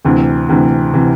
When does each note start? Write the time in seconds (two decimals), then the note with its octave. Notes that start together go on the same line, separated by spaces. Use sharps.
0.05 D2 C3 E3
0.49 D2 C3 E3
0.94 C3 E3